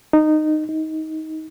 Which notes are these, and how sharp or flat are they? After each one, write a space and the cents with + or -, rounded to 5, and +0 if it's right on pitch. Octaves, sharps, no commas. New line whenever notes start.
D#4 -15
D#4 +20